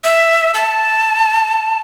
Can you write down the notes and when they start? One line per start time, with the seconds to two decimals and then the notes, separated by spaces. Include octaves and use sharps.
0.04 E5
0.54 A5